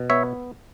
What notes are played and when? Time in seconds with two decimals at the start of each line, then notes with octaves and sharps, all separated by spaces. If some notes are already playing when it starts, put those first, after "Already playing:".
Already playing: B2
0.10 B3 C#5 E5